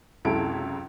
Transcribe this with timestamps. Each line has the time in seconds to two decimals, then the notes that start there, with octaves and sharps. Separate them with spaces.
0.25 C#2 F#2 C3 E4 A4 D7